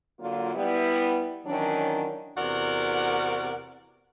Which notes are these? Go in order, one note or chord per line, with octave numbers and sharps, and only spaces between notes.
D3 F#3 A#3 F4
G3 B3 E4
D#3 E3 F#3 C#4 D4
E2 C3 F#4 A#4 D5 F#5